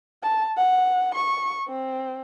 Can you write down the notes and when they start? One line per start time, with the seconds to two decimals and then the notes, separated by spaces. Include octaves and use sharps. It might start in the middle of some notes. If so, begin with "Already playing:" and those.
0.23 A5
0.57 F#5
1.14 C#6
1.68 C4